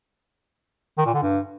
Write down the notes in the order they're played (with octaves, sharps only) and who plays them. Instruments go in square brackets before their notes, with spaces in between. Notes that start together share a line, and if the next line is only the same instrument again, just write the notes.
[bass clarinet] D#3
A#2
D3
G2